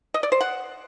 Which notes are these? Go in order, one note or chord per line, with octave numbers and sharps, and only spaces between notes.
D#5
D5
C5
F#5